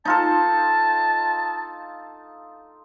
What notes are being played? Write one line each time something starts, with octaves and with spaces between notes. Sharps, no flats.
D#4 F4 A4 A5